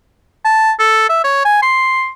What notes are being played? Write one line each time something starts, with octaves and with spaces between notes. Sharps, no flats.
A5
A4
E5
C#5
G#5
C6